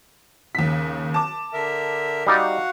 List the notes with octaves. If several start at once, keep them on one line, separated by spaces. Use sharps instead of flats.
D#2 C#3 B6
A5 D6
D3 A#4 E5
G3 D#4 F#4 D5 F5 F#5